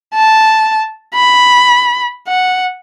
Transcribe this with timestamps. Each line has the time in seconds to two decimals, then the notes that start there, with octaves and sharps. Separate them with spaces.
0.15 A5
1.15 B5
2.28 F#5